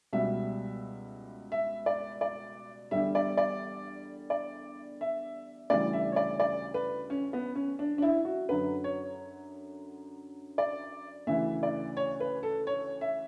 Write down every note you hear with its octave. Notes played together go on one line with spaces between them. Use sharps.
C#2 B2 G3 E5
E5
D5
D5
E2 D3 G3 E5
D5
D5
D5
E5
D2 C#3 E3 G3 D5
E5
C#5
D5
D5
B4
C#4
B3
C#4
D4
D4
E4
F#4
F#2 D3 F#3 B4
C#5
D5
D2 C#3 E3 E5
D5
C#5
B4
A4
C#5
E5